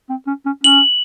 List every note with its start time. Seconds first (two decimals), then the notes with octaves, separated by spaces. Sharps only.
0.10 C4
0.27 C#4
0.46 C#4
0.64 C#4 F#7